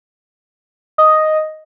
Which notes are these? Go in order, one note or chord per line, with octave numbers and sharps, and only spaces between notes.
D#5